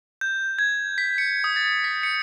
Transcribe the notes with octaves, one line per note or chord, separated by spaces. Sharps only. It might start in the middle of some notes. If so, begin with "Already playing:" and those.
G6
G#6
B6
C#7
D#6
A6
B6
C#7